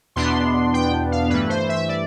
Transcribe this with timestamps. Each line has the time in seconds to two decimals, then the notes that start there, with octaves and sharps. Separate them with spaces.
0.16 E2 B2 B3 D4 C6
0.74 G5
1.12 F5
1.30 G2 E3 A3 B4
1.49 C5
1.69 E5
1.88 D5